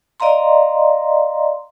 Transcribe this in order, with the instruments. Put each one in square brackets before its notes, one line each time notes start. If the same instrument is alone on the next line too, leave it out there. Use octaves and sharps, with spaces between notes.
[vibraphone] D5 D#5 F5 A#5 C6